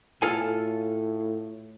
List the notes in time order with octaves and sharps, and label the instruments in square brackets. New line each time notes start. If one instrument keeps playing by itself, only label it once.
[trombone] A2 [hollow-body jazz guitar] F4 A4 G#5